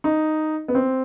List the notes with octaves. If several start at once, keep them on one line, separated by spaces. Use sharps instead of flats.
D#4
B3
C4